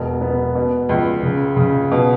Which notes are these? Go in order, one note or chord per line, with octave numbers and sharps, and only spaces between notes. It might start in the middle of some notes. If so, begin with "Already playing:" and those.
Already playing: E1 B2
B3
B2
C#2
C#3
C#3
B2